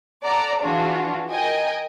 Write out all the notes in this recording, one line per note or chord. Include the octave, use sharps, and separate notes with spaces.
A4 D5 F#5 A#5
E3 D4 F4 F#4 G#4
A#4 D#5 G5 G#5